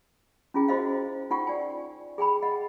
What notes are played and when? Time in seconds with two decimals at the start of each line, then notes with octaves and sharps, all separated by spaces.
0.54 C#4 E4 F4 G#4 G5
0.68 F#4 C5 D#5 F5
1.30 D#4 F4 F#5 G5 C#6
1.47 D5 G#5
2.18 G#4 G5 G#5 B5
2.43 D#5 F#5